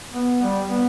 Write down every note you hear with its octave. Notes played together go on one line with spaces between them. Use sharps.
B3
G3
B3